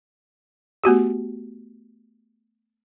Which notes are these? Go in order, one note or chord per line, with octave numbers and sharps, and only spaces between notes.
A3 B3 F#4 G4